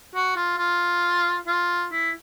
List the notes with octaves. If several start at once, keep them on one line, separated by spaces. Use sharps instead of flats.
F#4
F4
F4
F4
E4